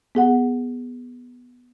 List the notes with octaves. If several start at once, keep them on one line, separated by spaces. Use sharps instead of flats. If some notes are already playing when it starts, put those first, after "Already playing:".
B3 G#4 F#5